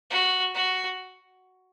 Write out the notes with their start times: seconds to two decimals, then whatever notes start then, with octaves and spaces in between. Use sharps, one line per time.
0.10 F#4
0.54 F#4